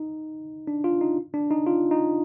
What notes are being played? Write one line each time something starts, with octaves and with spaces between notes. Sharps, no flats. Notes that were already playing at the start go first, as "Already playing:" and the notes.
Already playing: D#4
D4
F4
D#4
D4
D#4
F4
D#4